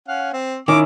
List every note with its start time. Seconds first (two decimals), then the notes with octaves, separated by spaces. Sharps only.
0.08 C#4 F5 F#5
0.33 C4
0.68 D#3 C#4 E4 D6